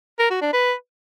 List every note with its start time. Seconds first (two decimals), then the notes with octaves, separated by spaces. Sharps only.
0.19 A#4
0.30 F#4
0.42 D4
0.53 B4